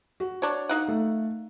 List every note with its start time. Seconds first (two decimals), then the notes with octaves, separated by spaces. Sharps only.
0.20 F#4
0.42 D4 C#5
0.69 A#3 D#4 F#5
0.88 A3